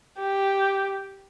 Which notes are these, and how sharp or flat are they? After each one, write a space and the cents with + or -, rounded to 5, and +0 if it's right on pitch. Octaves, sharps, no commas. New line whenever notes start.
G4 +0